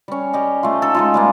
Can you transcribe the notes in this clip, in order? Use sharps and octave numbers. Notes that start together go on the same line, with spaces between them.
G3 C#4
G3 G4 D#5
A3 F4
D#4 A4
G#3 D#4 F4
G3 G#3 A#3